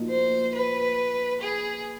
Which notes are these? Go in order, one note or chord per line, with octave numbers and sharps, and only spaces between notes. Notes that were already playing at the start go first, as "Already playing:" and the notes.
Already playing: A#2 F3 A#3 D#4 F#4
C5
B4
G#4